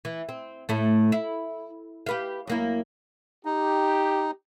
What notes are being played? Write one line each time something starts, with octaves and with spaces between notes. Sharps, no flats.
E3
C4
A2 A3
E4
G4 B4 F5
F#2 A#3 E4
D#4 G4